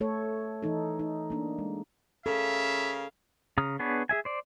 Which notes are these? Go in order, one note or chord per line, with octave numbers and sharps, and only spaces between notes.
A3 A4 C#5
E3 D#4 A4
D#4
A#3 D4
G#3
C#3 A4 A#4 E5 F5
C#3 A#5 D#6 F6
B3 D4 G#4 B4 C#5
G#4 E5 G#5
C5 D5